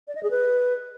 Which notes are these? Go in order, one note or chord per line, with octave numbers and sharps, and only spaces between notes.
D5
D#5
G#4
B4